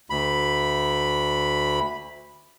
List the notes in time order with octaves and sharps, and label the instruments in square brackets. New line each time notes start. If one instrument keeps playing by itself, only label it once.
[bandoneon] D2 B5